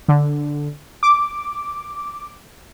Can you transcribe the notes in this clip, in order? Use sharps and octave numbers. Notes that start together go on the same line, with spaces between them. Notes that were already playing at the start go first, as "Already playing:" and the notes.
D3
D6